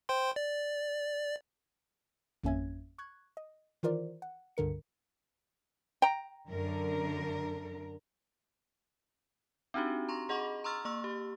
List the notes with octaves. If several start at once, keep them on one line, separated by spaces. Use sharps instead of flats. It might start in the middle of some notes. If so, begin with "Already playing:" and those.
C5 G5 C6
D5
G#1 F2 A#3 C#4 E5 G#6
C#6 F#6 G#6
D#5
D#3 E3 F4 A#4 C5 D5
F#5
C#2 G2 D3 A#4 C#7
G5 A#5
F#2 D3 A#4
C4 D4 D#4 F#4 G4
A#5 C6 C#6 A#6
G#4 D#5 F#5 B5 C#6 D6
A#5 C6 C#6 E6 F6 A6
A#3 C#6 E6
G4